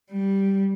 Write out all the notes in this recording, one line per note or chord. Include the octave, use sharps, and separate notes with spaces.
G3